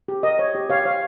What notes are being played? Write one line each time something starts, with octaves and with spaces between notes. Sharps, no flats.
G4
A#4 D#5
C#5
G4
G4 C#5 F5
C#5 F5